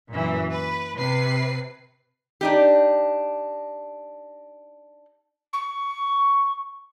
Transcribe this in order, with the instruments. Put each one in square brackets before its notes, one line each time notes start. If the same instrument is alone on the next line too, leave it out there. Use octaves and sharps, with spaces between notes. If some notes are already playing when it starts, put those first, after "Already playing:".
[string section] F#2 A#2 E3
B4
C3 B4 C7
[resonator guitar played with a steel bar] D4 D#4 G4
[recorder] C#6